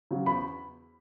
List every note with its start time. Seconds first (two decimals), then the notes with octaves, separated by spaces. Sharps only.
0.11 C#3 F#3
0.26 E2 B5